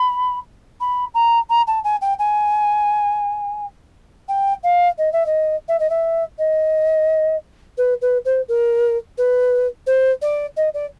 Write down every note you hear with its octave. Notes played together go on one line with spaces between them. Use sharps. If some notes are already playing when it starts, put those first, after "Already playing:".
Already playing: B5
B5
A#5
A#5
A5
G#5
G5
G#5
G5
F5
D#5
E5
D#5
E5
D#5
E5
D#5
B4
B4
C5
A#4
B4
C5
D5
D#5
D5